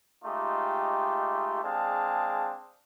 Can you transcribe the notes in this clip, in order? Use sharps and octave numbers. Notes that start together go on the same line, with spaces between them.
G#3 A3 D#4 F4 G4
G#3 C4 D4 G#4 F5 A5